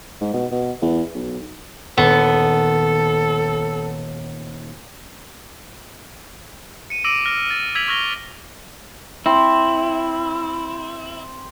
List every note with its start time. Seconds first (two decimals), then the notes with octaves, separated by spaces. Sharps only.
0.21 G#2
0.34 B2
0.52 B2
0.82 E2
1.14 B1
1.98 D#1 B3 A4
6.90 C#7 D#7
7.04 D6 E6 A#6 D7 D#7 F#7
7.26 F6 A#6
7.50 A6
7.75 E6 G#6 B6 F7 F#7
7.88 C#6 E6 F6 A#6 F7 G7
9.26 C4 E4